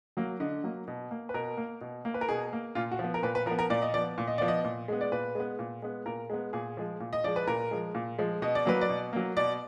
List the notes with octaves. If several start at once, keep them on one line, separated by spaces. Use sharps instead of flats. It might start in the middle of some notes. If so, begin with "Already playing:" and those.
F#3 A#3
D3 D#5
F#3 A#3
B2
A#3
B4
B2 A#4
A#3
B2
A#3
B4
A#4
B2 G#4
A#3
A#2 F4
F#4
F3 B3
A#4
A#2 B4
B4
F3 A#4
B3
A#4
A#2 D5
D#5
F3 B3 D5
A#2
D#5
F3 B3 D5
D#5
A#2
G#3 B3
D5
A#2 B4
G#3 B3
A#2
G#3 B3
A#2 A#4
G#3 B3
A#2 G#4
F3 G#3
A#2
D#5
F3 G#3 D5
B4
A#2 A#4
F3 G#3
A#2
F3 G#3
B2 D#5
D5
F#3 A#3 B4
D5
B2
F#3 A#3
B2 D5